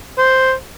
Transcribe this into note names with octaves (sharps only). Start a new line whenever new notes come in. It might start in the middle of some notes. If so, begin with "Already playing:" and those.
C5